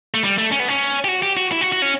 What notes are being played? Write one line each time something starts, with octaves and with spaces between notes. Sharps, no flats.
A3
G3
A3
C#4
B3
C#4
G4
F#4
G4
F#4
E4
F#4
F#4
C#4